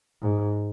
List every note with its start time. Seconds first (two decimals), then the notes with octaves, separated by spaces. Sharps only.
0.22 G#2